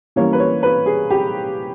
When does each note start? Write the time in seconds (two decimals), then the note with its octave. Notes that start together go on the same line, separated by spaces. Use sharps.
0.16 E3 G3 A#3 C#4 C#5
0.33 B4
0.39 C#5
0.63 B4
0.86 G#4
1.11 G4